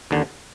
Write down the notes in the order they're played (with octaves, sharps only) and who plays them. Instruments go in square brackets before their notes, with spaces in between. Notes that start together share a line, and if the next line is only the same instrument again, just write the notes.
[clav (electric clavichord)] D#2 D3